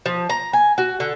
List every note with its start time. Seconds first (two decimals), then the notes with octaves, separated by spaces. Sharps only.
0.06 F3
0.29 A#5
0.53 G#5
0.78 F#4
1.00 D3